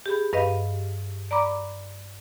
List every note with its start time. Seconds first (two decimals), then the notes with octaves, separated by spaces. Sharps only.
0.06 G4 G#4 B5
0.33 G2 B4 D#5 F5
1.31 D5 A#5 B5 D6